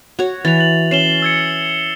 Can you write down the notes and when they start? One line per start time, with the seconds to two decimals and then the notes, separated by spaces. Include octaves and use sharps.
0.19 F#4 C#5
0.45 E3 A6 F7
0.59 A6 F#7
0.91 C#4 C7 E7 G7
1.22 E6 G#6 C#7